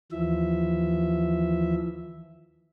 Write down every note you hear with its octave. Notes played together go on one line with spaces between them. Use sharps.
D#2 E3 F3 E5